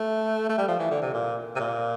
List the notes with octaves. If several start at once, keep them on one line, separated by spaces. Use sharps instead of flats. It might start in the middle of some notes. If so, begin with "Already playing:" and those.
Already playing: A3
A3
G3
F3
E3
D3
C3
A#2
C3
A#2